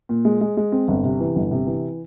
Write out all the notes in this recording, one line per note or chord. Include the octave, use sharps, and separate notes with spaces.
A#2
G#3
G#3
G#3
C4
G1
C3
E3
G1
C3
E3